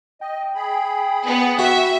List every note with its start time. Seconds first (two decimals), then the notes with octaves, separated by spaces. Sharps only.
0.21 D#5 G5
0.55 G#4 B5
1.25 B3
1.59 F#4 E5